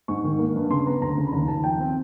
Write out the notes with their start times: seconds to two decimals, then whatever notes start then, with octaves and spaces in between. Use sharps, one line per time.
0.08 G#2 C#6
0.24 D#3
0.39 A#3
0.56 G2
0.71 C#3 C6
0.86 B3 A#5
1.01 D2 A#5
1.17 C#3
1.27 B5
1.32 D#2 A#5
1.48 D#2 A5
1.64 F3 G5
1.80 C4